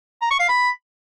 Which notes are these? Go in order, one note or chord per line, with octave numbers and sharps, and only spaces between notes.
A#5
C#6
F5
B5